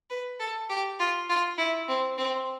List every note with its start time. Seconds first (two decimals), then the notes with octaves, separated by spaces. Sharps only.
0.10 B4
0.40 A4
0.70 G4
0.99 F4
1.29 F4
1.58 E4
1.88 C4
2.18 C4